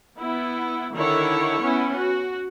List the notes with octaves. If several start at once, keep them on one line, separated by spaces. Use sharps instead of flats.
B3 E4
D3 D#3 E4 C#5
B3 C#4 E4
F#4